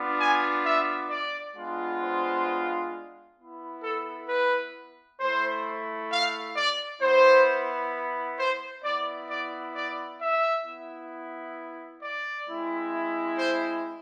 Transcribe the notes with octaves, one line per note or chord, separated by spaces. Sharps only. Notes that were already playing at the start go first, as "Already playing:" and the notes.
Already playing: B3 D4 F4
G#5
E5
D5
G#3 B3 D4 F4
C5
B3 E4
A4
B4
A3 E4 C5
F5
D5
B3 E4 C5
C5
B3 E4 D5
D5
D5
E5
B3 E4
D5
G#3 C4 E4
C5